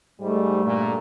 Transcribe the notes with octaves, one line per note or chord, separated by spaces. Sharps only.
G#2 G3 A3
G2 A#2